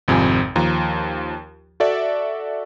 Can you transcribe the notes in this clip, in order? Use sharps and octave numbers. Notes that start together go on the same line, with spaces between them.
G#1 F2 C3 F4 G#5
D#2 F3 A#5
F#4 A4 D5 E5